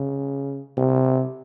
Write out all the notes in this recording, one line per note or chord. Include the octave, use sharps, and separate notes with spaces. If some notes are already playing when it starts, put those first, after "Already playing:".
Already playing: C#3
C3